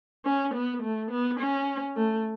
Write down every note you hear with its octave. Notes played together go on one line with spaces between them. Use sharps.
C#4
B3
A3
B3
C#4
A3